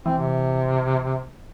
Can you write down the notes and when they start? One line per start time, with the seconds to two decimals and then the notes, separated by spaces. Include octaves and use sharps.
0.06 E3 C4
0.18 C3